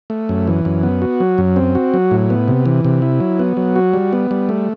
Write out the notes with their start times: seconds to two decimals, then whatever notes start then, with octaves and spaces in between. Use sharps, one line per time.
0.10 A3
0.29 F#2
0.47 E3
0.65 F#2
0.83 B3
1.02 F#4
1.20 F#3
1.38 F#2
1.56 C4
1.75 F#4
1.94 F#3
2.11 A2
2.30 B3
2.48 C3
2.66 E3
2.85 C3
3.02 E4
3.20 F#3
3.39 B3
3.57 F#3
3.76 F#4
3.93 G3
4.13 B3
4.31 G3
4.49 A3